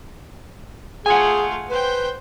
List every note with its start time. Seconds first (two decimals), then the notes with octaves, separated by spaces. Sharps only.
1.06 A3 F4 G#4 F#5 G#5
1.70 B4 C5 G5